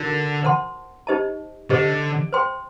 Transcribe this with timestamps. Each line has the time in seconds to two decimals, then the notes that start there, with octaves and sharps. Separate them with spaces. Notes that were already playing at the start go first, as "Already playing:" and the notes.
Already playing: D3 D#4 F#4 A#4
0.43 C5 F#5 A5 C6
1.07 D#4 G4 C5 D#5 A5
1.70 D3 G4 C5 D#5
2.33 C5 G5 C6